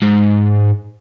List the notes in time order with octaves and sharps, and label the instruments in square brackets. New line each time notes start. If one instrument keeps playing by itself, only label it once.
[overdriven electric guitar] G#2